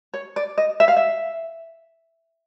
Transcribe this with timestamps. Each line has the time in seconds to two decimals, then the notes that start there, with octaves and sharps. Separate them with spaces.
0.14 C#5
0.36 D5
0.58 D#5
0.80 E5
0.88 F5
0.97 E5